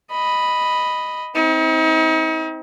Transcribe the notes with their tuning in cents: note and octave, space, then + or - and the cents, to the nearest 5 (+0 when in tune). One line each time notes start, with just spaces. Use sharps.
D#5 +0 B5 +0
C4 +0 D#4 +40